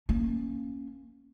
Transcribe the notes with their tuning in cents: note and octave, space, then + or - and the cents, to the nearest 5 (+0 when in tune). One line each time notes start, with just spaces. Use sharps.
A#3 +0 C#4 -5